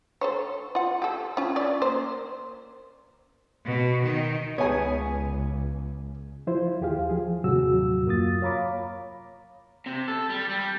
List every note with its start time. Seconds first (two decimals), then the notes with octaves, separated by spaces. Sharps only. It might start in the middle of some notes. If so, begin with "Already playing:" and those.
0.21 A4 C5 C#5
0.75 F4 F#5
1.02 G4 A4
1.37 C#4 F4
1.56 C#4 F4 D5
1.82 A#3 C5
3.65 B2
4.03 D#3
4.58 C#2 B3 G#4 C#5 G#5
6.47 F3 E4 F4 C5
6.81 D#2 G4 G#4 F5
7.09 F3 G#4
7.44 D#2 A2 C3 F#3 F#4 E6
8.06 F#2 A#3 F4 D#6 A6
8.42 C#5 F5 A#5 B5 D6
9.86 C3
10.08 A4
10.30 G3
10.49 G3